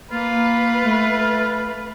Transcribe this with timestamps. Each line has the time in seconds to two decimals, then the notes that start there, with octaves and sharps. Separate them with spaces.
0.11 A#3 F4 B4
0.83 A3